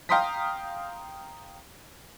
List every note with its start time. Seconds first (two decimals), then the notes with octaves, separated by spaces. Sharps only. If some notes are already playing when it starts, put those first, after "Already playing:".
0.09 F5 G5 A#5 C6 D#6 B6